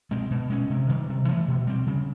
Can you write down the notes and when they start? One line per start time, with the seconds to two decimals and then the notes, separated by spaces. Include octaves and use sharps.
0.11 B2 G#3 C4
0.31 B2
0.50 G#3 C#4
0.70 C3
0.89 D#3 G3
1.09 C3
1.28 E3 A3
1.48 B2
1.67 G3 C4
1.86 C#3